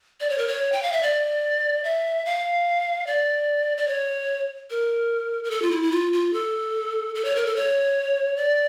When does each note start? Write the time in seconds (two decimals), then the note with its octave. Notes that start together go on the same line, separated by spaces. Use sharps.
0.20 D5
0.30 C#5
0.38 A#4
0.48 C#5
0.72 G5
0.83 F5
0.92 E5
1.03 D5
1.84 E5
2.26 F5
3.07 D5
3.77 D5
3.88 C#5
4.70 A#4
5.44 A#4
5.51 A4
5.62 F4
5.71 E4
5.82 E4
5.92 F4
6.13 F4
6.33 A4
7.15 A4
7.25 C#5
7.36 A#4
7.46 A4
7.56 C#5
8.37 D5